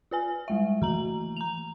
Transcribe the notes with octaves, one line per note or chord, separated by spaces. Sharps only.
F4 B4 G#5
G3 G#3 E5
E3 A3 A#3 F#4 A#5 F#7
A#5 F7